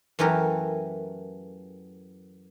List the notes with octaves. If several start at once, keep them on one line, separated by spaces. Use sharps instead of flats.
F#2 E3 A3 G4 A#4